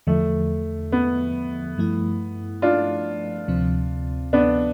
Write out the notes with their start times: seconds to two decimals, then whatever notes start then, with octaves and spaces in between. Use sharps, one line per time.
0.07 E2 D3 F3 A3
0.92 B3
1.78 G2 F3 A3 E4
2.62 D4 F4
3.48 D2 C3 F3 C4
4.33 B3 D4